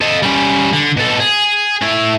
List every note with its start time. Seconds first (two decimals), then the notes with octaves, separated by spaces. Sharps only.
0.01 A4 D#5
0.23 G3 C#4
0.73 D3
0.97 B2 A4
1.20 G#4
1.82 A3 E4